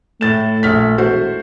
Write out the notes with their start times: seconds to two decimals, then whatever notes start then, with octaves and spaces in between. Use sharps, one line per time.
0.21 A2 A3 A6 E7
0.63 A#1 F6 B6
0.98 E1 A3 F#4 C5